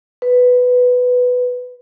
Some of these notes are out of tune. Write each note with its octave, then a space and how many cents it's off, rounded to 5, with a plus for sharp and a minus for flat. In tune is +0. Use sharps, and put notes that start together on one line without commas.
B4 +5